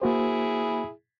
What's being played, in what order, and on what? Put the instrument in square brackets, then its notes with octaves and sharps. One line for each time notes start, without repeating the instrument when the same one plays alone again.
[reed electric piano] A#3 F#4 C5 [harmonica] E4 G#4